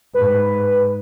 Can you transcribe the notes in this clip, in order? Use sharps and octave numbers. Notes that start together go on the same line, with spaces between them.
G#2 B4